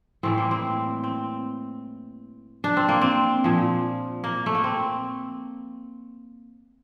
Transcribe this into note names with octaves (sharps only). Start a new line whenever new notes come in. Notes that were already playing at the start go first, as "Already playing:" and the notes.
A2 E3 G3 C4
A#3
C4
C4
D4
C4
A#3
C4
A#2 F3
A#3
A3
A#3
C4